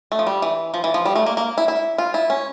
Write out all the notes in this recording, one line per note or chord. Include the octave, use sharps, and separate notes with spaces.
A3
F3
G3
E3
F3
E3
F3
G3
A3
A#3
A#3
E4
E4
F4
E4
C#4